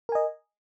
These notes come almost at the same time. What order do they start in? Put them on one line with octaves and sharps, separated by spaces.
A#4 G#5 D#5